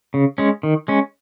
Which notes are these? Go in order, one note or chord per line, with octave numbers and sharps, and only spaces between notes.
C#3
G#3 C#4
D#3
G#3 C#4